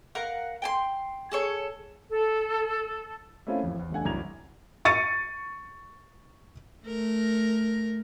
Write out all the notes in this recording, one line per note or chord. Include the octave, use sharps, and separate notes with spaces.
A#4 F5 F#5
G5 G#5 C6
G#4 A4 C#5
A4
A3 A#3 C4 C#4 E4 F4
A1 F2
E2
D#1 A3 D4 F#5 G#5
C2 F#2 F#4 A#5 G#6 F7
C#6 A6 C#7 D#7
A3 A#4